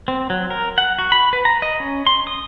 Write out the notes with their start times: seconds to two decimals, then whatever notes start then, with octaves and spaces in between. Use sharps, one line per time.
0.08 C4
0.30 F#3
0.50 A#4
0.78 F#5
0.99 F#4
1.12 B5
1.33 B4
1.45 A#5
1.62 D#5
1.80 C#4
2.07 C6
2.27 D#6